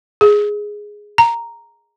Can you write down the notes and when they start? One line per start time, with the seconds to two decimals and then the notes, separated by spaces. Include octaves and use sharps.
0.21 G#4
1.18 A#5